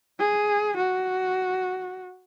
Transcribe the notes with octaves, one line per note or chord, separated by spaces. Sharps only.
G#4
F#4